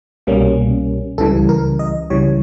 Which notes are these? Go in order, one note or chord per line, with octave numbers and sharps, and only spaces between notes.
C2 B2 G3 A#3 C#4
C#2 C#3 E3 G3 A4
A#4
D#5
C#2 C#3 E3 G3 C#5